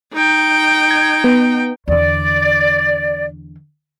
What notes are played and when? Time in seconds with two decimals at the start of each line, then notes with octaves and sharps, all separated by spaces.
0.13 D#4 G5
0.91 G#6
1.24 B3
1.88 E2 D3 D5